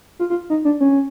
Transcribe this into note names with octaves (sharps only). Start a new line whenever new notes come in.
F4
F4
D#4
D4
C#4